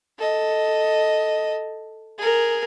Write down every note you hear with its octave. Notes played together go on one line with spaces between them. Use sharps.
A4 D#5
G#4 A#4